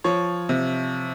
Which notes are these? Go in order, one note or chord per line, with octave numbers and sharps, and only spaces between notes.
F3 C#5
C3